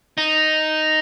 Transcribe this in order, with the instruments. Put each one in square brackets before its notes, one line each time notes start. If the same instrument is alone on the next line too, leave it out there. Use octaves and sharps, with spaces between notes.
[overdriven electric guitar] D#4